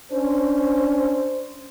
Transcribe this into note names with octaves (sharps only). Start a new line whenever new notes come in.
C#4 D4 C5